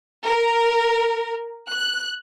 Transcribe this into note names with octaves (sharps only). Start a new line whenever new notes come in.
A#4
F#6